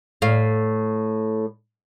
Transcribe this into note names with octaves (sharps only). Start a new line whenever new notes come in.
A2 F5